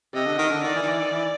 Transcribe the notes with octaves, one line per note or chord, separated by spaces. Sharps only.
C3 D#5
D3
D#3
D3
D#3 D5
E3
D#3
E3
D#3
E3